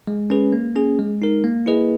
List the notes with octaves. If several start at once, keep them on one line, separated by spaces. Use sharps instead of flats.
G#3
C#4 G#4 B4
A#3
C#4 G#4
G#3
D#4 A#4
A#3
E4 G#4 B4 D#5